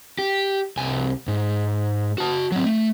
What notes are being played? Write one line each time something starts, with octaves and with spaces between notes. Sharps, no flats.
G4
C2 G#5
G#2
F#4 A5
F#3 C4
A3